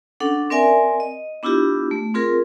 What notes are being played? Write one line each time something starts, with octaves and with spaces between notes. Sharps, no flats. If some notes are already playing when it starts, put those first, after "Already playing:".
C#4 D4 A4 F#5
C4 A#4 D5 E5 G#5
D#5
B3 D4 E4 F4 G4
A3
C4 F4 G#4 A#4